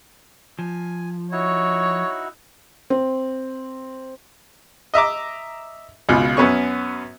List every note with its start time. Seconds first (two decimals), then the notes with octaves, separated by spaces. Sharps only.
0.59 F3 G#5
1.32 D#4 E4 F#4 C#5
2.90 C4
4.94 D#5 E5 A#5 D6
6.09 G#1 C#2 B2 F4
6.37 F#2 B3 C#4 C#6